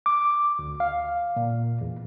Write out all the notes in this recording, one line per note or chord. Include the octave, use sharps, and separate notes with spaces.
D6
D2
F5
A#2
E2